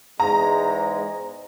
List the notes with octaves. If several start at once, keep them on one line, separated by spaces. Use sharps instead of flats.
E2 G#2 G#3 A#5